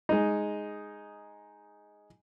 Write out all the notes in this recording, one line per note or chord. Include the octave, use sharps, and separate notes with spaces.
G#3 D#4